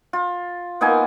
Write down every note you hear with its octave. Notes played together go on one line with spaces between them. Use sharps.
F4
A#3 B3 D#4 G#5